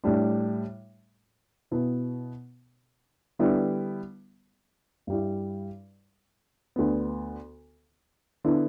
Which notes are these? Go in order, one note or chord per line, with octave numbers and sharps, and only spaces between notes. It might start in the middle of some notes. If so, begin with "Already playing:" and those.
A2 G3 D4
B2 B3 E4
D3 G3 B3 E4
G2 G3 E4
D2 D3 B3
D3 B3 E4